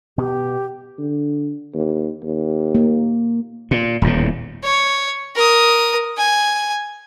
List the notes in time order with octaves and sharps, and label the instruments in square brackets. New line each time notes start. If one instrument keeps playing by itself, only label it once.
[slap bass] B2 B3 [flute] G4
[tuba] D3
D#2
D#2
[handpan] A#3
[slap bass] A#2
D#1 E2 A2
[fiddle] C#5
A#4 D#6
G#5